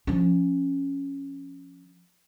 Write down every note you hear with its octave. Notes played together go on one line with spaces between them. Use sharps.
F3 C#4